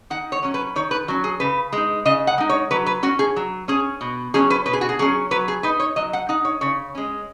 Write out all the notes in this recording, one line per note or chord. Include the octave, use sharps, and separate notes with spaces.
D#3 F#5
C#5
F#3 C#4
B4
D#3 C#5
B4
F#3 C#4
G#4
C#3 B4
G#3 D#4
C#3 D#5
F#5
G#3 D#4
C#5
F#3 B4
B4
C#4 F#4
G#4
F#3
C#4 G#4
B2
F#3 C#4 G#4
B4
B2 B4
G#4
F#4
G#4
F#3 C#4 G#4
F#3 B4
G#4
D#4 B4
C#5
F#3 D#5
F#5
D#4 F#5
C#5
C#3 C#5
G#3 C#4